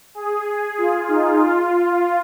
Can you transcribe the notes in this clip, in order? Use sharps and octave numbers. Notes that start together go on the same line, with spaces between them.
G#4
F4
D#4
F4